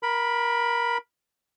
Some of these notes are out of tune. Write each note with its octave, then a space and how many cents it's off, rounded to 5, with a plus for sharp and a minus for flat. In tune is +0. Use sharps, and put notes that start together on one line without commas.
A#4 +20 B5 +0